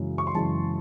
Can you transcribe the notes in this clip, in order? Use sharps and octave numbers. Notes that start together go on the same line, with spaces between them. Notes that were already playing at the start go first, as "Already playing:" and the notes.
Already playing: F#2 C#3 E3 G#3
C#6
C6
F#2 C#3 E3 G#3 A5